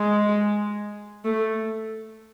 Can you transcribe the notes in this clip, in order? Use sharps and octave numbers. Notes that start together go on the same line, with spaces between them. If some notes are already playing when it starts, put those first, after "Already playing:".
Already playing: G#3
A3